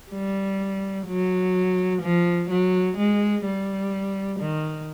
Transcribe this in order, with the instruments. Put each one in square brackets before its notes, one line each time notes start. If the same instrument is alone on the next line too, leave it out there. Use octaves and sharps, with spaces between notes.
[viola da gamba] G3
F#3
F3
F#3
G#3
G3
D#3